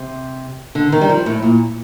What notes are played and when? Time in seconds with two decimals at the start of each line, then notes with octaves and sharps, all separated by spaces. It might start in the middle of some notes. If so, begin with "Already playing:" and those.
Already playing: C3
0.75 D3
0.92 D#3
1.01 G3
1.09 F3
1.26 A2
1.42 A#2